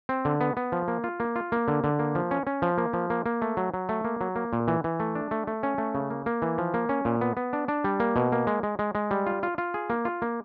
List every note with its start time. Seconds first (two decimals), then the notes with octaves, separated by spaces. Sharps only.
0.09 C4
0.25 D3
0.41 B3
0.57 B3
0.72 F3
0.88 A#3
1.04 F4
1.20 A#3
1.36 F4
1.52 A#3
1.68 D3
1.84 D3
1.99 A#3
2.15 F3
2.31 C#4
2.47 C#4
2.62 F3
2.78 A#3
2.93 F3
3.10 A#3
3.26 A#3
3.42 A3
3.57 F#3
3.74 F#3
3.89 A3
4.05 A#3
4.21 F#3
4.36 A#3
4.53 A#2
4.68 E3
4.84 E3
5.00 A3
5.15 D4
5.31 A3
5.47 A3
5.63 C#4
5.78 A3
5.95 C#3
6.10 A#3
6.26 A#3
6.42 E3
6.58 F3
6.74 A#3
6.89 C#4
7.05 A#2
7.21 B3
7.37 B3
7.53 D4
7.68 D4
7.84 G3
8.00 A#3
8.16 B2
8.32 A#3
8.47 G#3
8.63 G#3
8.79 G#3
8.95 G#3
9.11 G3
9.27 F4
9.43 F4
9.58 F4
9.74 G#4
9.90 A#3
10.05 F4
10.22 A#3